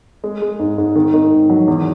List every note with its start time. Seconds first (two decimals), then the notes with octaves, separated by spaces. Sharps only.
0.24 G#3
0.42 G#3
0.59 G#2
0.78 G#2
0.96 D#3
1.14 D#3
1.32 G#2
1.50 F#3
1.68 E2